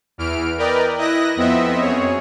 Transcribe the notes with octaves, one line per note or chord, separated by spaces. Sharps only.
E2 E3 F6 D7
A#4 B4 D5 D#5 G5
E4 D#5 D#6 F#6 A#6
F2 B3 C4 D#5 E5
F#2 G#4 C#5